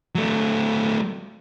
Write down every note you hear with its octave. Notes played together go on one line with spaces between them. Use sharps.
F#3 A3